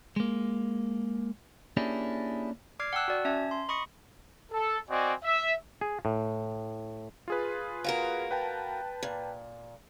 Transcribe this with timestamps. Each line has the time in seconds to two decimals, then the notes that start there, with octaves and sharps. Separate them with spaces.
0.16 G#3 A#3
1.77 A#3 C#4 D4 E4 G4 G#4
2.79 D5 D6 F6 G#6 C7
2.93 F#5 G5 A5 E6 F#6
3.08 F#4 D5
3.25 C#4 E5 A5 G#6
3.51 C6
3.68 D#5 B5 C#6 D#6 A#6 C#7
4.52 A4
4.90 C4 F#4 D5 D#5 G#5
5.24 E5
5.81 G#4
6.05 A2
7.28 F4 G#4 B4
7.84 A#3 F#4 A#4
8.31 B4 G5 A5
9.03 A#2